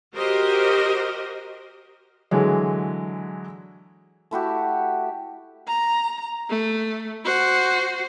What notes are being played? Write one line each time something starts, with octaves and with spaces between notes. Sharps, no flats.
F#4 G4 A#4 C5 D#5
D3 E3 F#3 G#3
A3 E4 F#4 G4
A#5
A3
F#4 C5